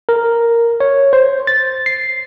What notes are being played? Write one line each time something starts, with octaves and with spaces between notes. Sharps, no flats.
A#4
C#5
C5
A6
C7